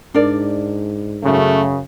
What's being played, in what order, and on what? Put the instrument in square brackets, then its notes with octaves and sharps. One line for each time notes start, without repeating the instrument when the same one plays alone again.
[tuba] G#2 [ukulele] D4 A#4 D5
[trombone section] F#2 C#3 [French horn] A3